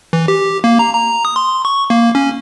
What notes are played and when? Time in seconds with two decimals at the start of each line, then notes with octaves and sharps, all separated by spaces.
0.13 E3
0.28 G4
0.64 A#3
0.79 A#5
0.94 A#5
1.25 D#6
1.36 C6
1.65 C#6
1.90 A#3
2.15 C#4